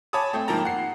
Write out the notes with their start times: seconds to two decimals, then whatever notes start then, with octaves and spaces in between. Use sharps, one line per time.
0.13 C#5 G#5 A5 B5 D6 D#6
0.33 A3 C4
0.48 G#2 F3 A#3 G5 A5 A#5
0.65 F#5 C7